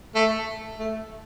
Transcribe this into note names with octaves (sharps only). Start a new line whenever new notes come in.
A3
A3